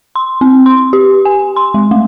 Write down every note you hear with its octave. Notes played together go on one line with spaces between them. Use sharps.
C6
C4
C6
G4
G#5
C6
G#3
A3